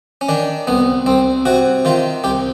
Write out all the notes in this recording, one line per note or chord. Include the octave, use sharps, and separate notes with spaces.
C#4
D#3 D4
C2 B3
C2 C4
C3 F#4
D#3 F4
C2 G4